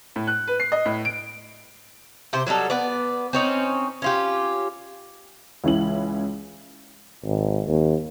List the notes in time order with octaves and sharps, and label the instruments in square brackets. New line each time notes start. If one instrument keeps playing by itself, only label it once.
[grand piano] A2
F#6
B4
C7
D#5
A2
D7
[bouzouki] C3 G4 C5
F#3 G3 D#4 A4
B3 B4 D5
C4 C#4 D#4
C#4 F4 G4
[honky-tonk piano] C#2 E3 C#4 E4 F#7
[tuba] G#1
D#2